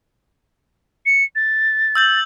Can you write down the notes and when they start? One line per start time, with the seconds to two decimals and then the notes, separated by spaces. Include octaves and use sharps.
1.06 C#7
1.36 A6
1.95 E6 G6 F#7